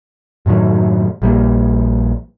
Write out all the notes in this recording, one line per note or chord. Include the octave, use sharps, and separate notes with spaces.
F#2 A2 D#3 F#3
A#1 G3 A#3